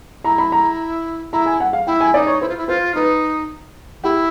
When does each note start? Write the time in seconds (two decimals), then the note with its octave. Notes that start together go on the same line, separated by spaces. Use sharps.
0.24 E4 A#5
0.38 B5
0.52 A#5
1.32 E4 A#5
1.46 G#5
1.60 F#5
1.73 F5
1.87 E4 G5
2.01 G#5
2.14 D#4 D5
2.27 C#5
2.41 E4 C5
2.49 F4
2.57 E4
2.68 F4 C5
2.95 D#4 B4
4.03 E4 G4